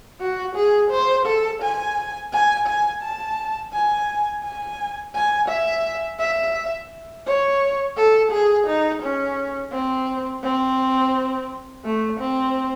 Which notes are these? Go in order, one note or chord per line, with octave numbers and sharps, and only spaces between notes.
F#4
G#4
C5
A4
G#5
G#5
G#5
A5
G#5
G#5
G#5
E5
E5
C#5
A4
G#4
D#4
C#4
C4
C4
A3
C4